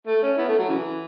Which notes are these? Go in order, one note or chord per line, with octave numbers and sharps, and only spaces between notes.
A3
C#4
B3 E4
A3
F#3
C#3 E3